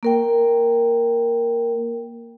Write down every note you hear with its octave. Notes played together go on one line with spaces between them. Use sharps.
A#3 A#4 G5